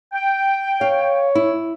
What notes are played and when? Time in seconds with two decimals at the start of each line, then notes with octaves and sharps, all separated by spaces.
0.13 G5
0.81 C#5 F5
1.35 E4